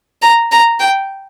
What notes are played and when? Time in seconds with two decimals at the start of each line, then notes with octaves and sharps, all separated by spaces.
0.22 A#5
0.52 A#5
0.80 G5